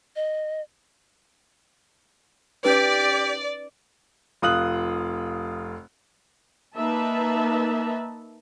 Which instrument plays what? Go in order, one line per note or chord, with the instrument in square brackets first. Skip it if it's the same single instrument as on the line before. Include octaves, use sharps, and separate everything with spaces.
[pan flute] D#5
[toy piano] C#4 D#4 B4 [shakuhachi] G4 [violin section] D5
[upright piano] F1 F4 D#6 F#6 F#7
[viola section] A#3 D#4 B4 E5 A5